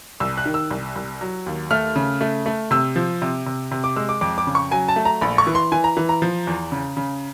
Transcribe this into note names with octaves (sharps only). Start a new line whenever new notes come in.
C2 E6
F#6
D#3
E6
C2
C2
F#3
D#2
A3 F6
C#3
A3
A3
C3 E6
F3
C3
C3
C3
D6
G#3 E6
D6
F2 D6
D6
C#3
C#6
F#3 G#5
A5
A3
A#5
A#1 B5
C#6
E3
C6
E3 G#5
A#5
E3
A#5
F3
E2
C#3
C#3